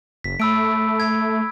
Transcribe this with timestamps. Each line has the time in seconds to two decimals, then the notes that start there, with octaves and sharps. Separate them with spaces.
0.24 F#1 B6
0.40 A3 B5 E6 D7
1.00 G#6